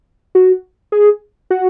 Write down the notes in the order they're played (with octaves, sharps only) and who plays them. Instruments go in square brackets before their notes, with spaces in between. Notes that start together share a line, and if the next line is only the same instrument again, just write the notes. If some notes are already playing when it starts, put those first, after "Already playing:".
[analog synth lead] F#4
G#4
F#4